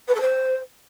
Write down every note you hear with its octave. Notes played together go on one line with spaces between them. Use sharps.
B4
A4
C5